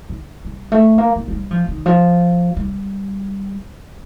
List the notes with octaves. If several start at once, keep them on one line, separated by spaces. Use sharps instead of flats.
D3
G3
A3
A#3
A#3
F3
G3
F3
D#3
F3
G3